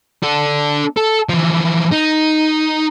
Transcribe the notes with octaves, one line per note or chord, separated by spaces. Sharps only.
D4 A4
A4
E3 F3
D#4